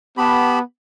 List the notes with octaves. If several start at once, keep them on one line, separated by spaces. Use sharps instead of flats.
B3 G4 A5 B5